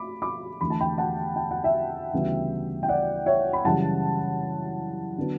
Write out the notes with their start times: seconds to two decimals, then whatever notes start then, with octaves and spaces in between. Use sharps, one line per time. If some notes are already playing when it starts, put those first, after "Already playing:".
Already playing: A3 B5 D6
0.22 B5 D6
0.61 E2 D3 A3 B5
0.70 A5
0.80 G5 B5
0.98 F#5 A5
1.36 G5
1.51 F#5
1.64 E5 G5
2.13 D2 C#3 E3 G3 B3
2.83 G5
2.89 D5 F#5
3.26 C#5 E5
3.53 B5
3.64 F#2 C#3 E3 G3 F#5 A5
5.18 D3 F#3 B3